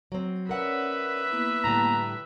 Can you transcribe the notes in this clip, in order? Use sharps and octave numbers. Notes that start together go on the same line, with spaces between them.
F#3 C4
C#4 A#4 B4 C#5 D5 E5 F#5
A#3 B3 E4
A2 D3 G3 A#5